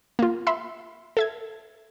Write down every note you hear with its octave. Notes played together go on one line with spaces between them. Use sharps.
A#3 F4
E5 B5 C6 E6
A4 E5 G#6